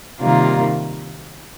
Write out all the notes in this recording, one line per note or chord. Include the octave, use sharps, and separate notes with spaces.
C3 D#3 G3 A#3 F4